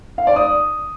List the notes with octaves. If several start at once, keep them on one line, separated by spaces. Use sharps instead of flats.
F5
D5
D#6